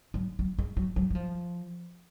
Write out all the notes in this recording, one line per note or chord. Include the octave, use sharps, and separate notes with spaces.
F#3
F#3
G#3
F#3
F#3
F#3
F3